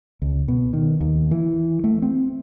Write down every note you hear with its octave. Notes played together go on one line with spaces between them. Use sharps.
C#2
B2
D#3
D#2
E3
A3
C4